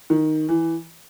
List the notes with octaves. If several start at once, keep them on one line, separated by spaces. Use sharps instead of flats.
D#3
E3